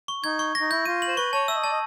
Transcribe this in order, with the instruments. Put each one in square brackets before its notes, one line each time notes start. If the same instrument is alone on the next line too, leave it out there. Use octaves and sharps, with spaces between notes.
[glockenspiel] C#6
[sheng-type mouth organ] D#4 [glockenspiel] G#6
[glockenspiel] C#6
A#6
[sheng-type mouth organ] D#4
[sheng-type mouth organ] E4 [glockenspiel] G6
[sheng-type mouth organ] F4 [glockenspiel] D#7
[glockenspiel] F#7
[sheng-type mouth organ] C5
[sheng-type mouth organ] B4 [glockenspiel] C#6
[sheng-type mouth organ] C#5 [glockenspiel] A5
[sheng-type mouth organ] E5 [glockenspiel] E6
[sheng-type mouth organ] D#5
[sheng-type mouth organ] D5 [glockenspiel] A5
[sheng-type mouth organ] D#5